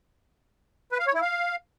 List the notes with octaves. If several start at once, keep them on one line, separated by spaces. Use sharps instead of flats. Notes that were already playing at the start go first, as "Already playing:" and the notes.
B4
F5
C#5
E4
F5